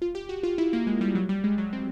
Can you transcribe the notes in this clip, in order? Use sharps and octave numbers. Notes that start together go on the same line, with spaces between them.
F4
G4
F#4
F4
E4
A#3
G#3
G3
F#3
G3
G#3
F#3
C4